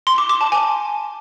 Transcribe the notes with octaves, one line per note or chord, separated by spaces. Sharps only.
C6
D6
D6
A5
G#5